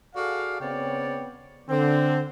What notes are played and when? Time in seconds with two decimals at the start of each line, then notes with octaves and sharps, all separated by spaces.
0.15 F#4 G#4 A4 D5 F5
0.60 C#3 B3 C4 C#5 D5 G5
1.69 D3 C4